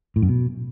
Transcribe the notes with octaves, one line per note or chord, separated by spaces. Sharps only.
A2
F#2
B2